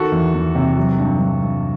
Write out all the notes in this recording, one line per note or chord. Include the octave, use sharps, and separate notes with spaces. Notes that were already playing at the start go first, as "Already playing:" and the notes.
Already playing: D#3 F#4 A4
E2
E2
C3
F#3
G2
G2
G2